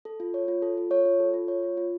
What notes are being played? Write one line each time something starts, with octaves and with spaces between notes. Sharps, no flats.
A4
F4
C#5
F4
A4
F4
C#5
F4
A4
F4
C#5
F4
F4